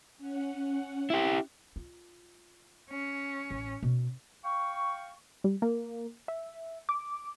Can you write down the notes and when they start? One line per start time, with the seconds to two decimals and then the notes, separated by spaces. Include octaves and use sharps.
0.18 C#4 F#5
1.10 E4 G4
1.76 F4
2.90 C#4
3.51 A1
3.83 B2
4.44 F5 G5 C#6
5.44 G3
5.62 A#3
6.28 E5
6.89 D6